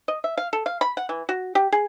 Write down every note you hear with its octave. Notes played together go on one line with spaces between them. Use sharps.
D#5
E5
F5
A4
F5
B5
F#5
E3
F#4
G4
G#4